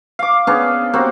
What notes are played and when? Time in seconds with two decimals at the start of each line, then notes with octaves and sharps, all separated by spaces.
0.19 F5 D6
0.47 B3 C#4 D4 G#4
0.93 A#3 C4 F#4 G4